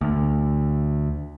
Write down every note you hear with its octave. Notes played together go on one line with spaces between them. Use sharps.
D2